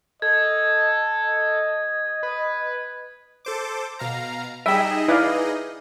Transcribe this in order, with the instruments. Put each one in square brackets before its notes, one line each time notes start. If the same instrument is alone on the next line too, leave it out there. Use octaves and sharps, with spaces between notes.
[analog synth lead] A4 [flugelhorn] D#5 [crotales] G#6
[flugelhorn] D#5
[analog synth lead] B4
[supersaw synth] A4 C5 D6
B2 F5 A#5
[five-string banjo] G3 G5 [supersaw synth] D#4 G#4 D#5 [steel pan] E5
[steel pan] E4 D5 F5 [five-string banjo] B4 E5